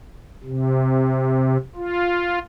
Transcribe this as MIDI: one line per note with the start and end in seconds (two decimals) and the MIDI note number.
0.44 1.57 48
1.76 2.39 65